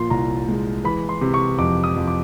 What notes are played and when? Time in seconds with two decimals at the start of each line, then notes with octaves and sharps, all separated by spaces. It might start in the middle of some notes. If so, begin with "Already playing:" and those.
Already playing: A#2 F3 C6
0.10 C2 A#5
0.48 G#3
0.84 E3 B5
1.09 C6
1.21 C3
1.34 C#6
1.59 F2 D6
1.84 D#6
1.96 F2
2.08 D6